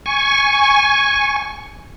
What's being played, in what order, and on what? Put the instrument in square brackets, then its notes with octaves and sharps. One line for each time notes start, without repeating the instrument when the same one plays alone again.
[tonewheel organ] G#5 C#6